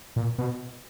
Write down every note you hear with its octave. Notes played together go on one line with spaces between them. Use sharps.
A#2
B2